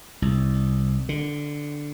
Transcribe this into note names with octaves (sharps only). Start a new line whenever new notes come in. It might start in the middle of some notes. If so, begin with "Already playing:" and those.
C2
D3